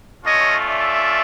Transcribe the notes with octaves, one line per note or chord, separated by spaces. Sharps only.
A3 C#4 F4 C#5 D#5
D5 E5